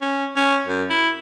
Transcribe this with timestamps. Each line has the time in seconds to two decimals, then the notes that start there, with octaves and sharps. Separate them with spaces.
0.02 C#4
0.36 C#4
0.67 F#2
0.90 E4